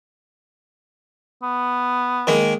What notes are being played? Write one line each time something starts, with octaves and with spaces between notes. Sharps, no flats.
B3
D#3 G#3 A#3